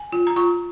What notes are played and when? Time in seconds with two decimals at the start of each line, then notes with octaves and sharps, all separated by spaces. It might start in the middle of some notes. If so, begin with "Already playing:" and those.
Already playing: G#5
0.12 F4
0.27 A#5
0.36 F4 C#6